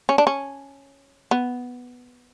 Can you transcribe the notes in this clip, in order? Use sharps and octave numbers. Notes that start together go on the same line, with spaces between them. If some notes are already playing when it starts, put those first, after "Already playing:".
C#4
D4
C#4
B3